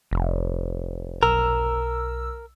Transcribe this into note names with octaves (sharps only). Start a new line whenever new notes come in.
F1
B1 A#4 E6